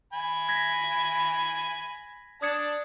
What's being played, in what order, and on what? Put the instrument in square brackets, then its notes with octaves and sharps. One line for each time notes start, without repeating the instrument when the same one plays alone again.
[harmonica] G#5 B5
[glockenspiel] G#6 A#6 B6
[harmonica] D4 A5 [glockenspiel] D#6 G#6 C#7